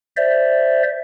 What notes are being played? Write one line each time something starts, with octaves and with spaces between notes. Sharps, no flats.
C5 D5 E5